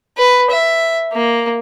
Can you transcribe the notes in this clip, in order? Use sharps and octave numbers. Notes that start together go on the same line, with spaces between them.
B4
E5
A#3